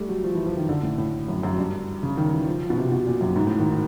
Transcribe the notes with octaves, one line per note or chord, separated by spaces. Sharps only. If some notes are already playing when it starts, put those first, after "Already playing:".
Already playing: G3 A3
F#3
F3
E3
F3
D#3
D3
A2
A2
F#2
F#2
G2
C#3
D#3
E3
F3
F3
B2
C3
B2
A#2
F#2
G#2
A2
D#3
D#3